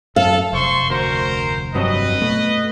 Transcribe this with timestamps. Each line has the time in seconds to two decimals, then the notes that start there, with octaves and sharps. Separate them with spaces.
0.16 F#2 A4 F5
0.53 F1 C5 C6 C#6
0.90 D2 A#4 C5
1.75 G2 F#3 C4 B4 D#5
2.21 B2 A3